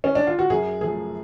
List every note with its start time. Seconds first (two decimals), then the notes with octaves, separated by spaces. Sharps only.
0.04 C#4
0.15 D4
0.27 F4
0.39 F#4
0.50 F#2 G#4
0.81 F3 A3 G#4